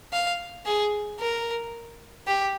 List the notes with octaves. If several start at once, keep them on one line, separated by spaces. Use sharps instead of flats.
F5
G#4
A#4
G4